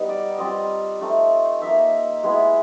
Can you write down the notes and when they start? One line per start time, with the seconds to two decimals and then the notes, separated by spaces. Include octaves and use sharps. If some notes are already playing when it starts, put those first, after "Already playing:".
Already playing: G3 B3 D#4
0.09 D5
0.38 G3 C4 F4 D#5
1.01 A3 C4 D#4
1.62 A#3 D#4 E5
2.24 G#3 B3 E4